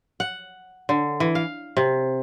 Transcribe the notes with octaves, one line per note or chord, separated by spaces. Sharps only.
F#5
D3
E3
F5
C3